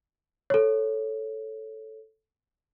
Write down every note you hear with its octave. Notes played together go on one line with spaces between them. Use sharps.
A4 C#5